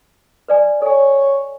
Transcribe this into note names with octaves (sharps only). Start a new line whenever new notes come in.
B4 D5 G#5
A4 C#5 G#5